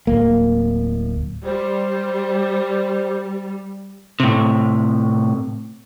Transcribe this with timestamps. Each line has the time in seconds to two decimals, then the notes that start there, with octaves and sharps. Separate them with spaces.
0.07 D1 A#3
1.45 G3 C5
4.20 A2 C3